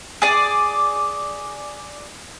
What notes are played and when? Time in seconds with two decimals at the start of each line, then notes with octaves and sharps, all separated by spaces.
0.22 G#4 D5